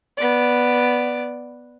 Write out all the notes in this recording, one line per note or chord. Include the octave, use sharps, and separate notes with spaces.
B3 D5